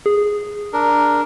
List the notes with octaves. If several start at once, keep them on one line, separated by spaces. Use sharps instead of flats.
G#4
D4 A#4